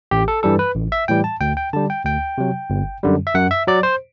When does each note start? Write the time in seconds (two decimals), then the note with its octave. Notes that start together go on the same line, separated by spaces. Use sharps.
0.11 A1 G4
0.28 A4
0.43 G2 E3 G3 A4
0.59 B4
0.75 A1
0.92 E5
1.08 A2 E3 G3 G5
1.24 A5
1.41 D2 G5
1.57 G5
1.73 D3 G3 A5
1.90 G5
2.05 D2 G5
2.38 C3 F#3
2.70 G1
3.03 F#2 D3 G3
3.27 E5
3.35 F#2 F#5
3.51 E5
3.67 F#3 D5
3.83 C5